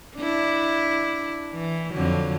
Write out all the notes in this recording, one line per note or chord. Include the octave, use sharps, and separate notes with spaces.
D4 E4
E3
F2 D3 F#3